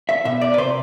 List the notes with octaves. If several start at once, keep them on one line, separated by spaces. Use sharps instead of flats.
E5
B2 E5
D5
B4
C3 C5